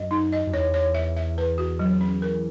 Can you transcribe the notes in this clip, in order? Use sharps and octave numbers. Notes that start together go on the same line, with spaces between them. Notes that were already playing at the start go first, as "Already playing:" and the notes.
Already playing: F#2 D#5
D#4
D#5
F#2
E2 C#5
C#5
E5
E5
B4
F#4
F#3
C#4
A#4